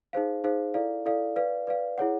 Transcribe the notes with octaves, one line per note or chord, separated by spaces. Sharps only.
D#4 G#4 C5 F5
D#4 G#4 C5 F5
E4 A4 D5 F5
E4 A4 D5 F5
B4 D5 F5
B4 D5 F5
E4 G#4 C#5 F#5